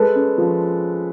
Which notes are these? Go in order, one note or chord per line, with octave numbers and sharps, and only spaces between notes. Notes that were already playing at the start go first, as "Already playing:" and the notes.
Already playing: G#3 A4 B4
C#4
F3